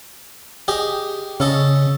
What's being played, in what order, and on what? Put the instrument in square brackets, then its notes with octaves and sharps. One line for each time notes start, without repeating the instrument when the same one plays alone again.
[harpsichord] G4 G#4 D#5
[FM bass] C#3 [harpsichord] C#4 A4 D#5